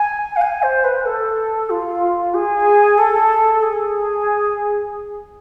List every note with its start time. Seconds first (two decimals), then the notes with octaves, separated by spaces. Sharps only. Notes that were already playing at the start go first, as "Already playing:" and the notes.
Already playing: G#5
0.36 F5
0.41 G#5
0.63 C5
0.84 B4
1.06 A4
1.70 F4
2.34 G#4
2.98 A4
3.63 G#4